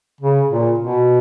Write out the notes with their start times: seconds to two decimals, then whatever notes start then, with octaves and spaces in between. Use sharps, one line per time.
0.21 C#3
0.49 A#2
0.78 B2